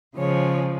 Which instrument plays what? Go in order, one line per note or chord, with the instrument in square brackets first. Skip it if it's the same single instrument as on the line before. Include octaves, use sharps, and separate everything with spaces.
[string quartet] C#3 F3 G#3 C#5